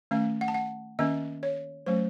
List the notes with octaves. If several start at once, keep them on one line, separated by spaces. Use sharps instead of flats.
D#3 A3 C#4 F5
F#5
A5
F#5
D#3 A#3 C#4 D#5
C#5
F#3 A3 C#4 C5